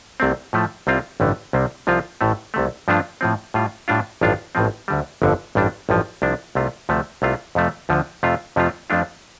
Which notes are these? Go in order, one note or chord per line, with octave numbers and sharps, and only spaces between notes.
C2 C3 A3 C4
A2 F3 A3
C2 C3 G3 C4 F4
A1 G2 D3 A3
C2 C3 G3 C4
C2 C3 F3 C4 F4
A1 A2 A3
C2 C3 A3
G2 F3 A3 D4 F4
A2 F3 C4
A2 G3 F4
A2 G3 D4 F4
A1 G2 F3 D4 F4
A1 A2 F3 C4
D2 D3 G3
G1 F2 D3
A1 G2 G3 D4
A1 G2 F3
C2 C3 F3 D4
C2 C3 A3 F4
D2 C3 F3 A3
C2 C3 A3 F4
F2 C3 F3 A3
D2 D3 F3
F2 C3 A3 F4
F2 C3 F3 A3 F4
F2 F3 A3 D4 F4